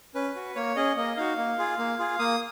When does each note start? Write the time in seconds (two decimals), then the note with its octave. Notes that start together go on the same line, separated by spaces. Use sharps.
0.15 C#4 B4
0.35 F#4
0.55 A#3 C#5
0.76 C#4 G#4 D#5
0.96 A#3 D#5
1.17 D#4 F#4 F5
1.37 A#3
1.58 F4 G#4
1.79 A#3
1.99 F4 G#4
2.19 A#3 D#6